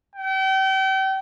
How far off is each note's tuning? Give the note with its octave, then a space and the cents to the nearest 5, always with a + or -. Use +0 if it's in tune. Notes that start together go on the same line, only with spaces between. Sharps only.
G5 -35